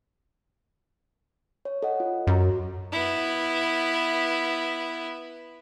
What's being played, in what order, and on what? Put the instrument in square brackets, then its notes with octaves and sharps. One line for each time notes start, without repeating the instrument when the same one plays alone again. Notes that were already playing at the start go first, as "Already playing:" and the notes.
[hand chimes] C#5
A4 D#5 F#5
F4
[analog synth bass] F#2 [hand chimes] F#4 A#5
[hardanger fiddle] B3 E4